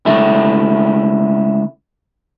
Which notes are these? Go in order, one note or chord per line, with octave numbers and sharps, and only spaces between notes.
C#2 A3 E4